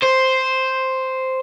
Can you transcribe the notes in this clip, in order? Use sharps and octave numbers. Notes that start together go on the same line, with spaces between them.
C5